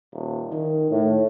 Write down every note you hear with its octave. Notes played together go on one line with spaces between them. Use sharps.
D#1
D#3
A2